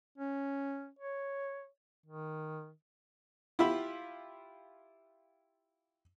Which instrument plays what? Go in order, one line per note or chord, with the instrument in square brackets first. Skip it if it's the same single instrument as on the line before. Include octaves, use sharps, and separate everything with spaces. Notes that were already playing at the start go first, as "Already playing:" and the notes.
[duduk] C#4
C#5
D#3
[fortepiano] E4 F4 G4 E5 B5